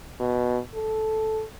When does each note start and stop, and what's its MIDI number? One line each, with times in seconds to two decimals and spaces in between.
0.20 0.59 47
0.74 1.45 69